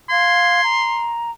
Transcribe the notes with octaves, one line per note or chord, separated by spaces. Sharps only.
F5 C6 G#6
A#5